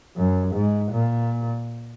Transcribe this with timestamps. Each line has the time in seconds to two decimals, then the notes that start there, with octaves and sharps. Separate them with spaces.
0.17 F#2
0.54 G#2
0.92 A#2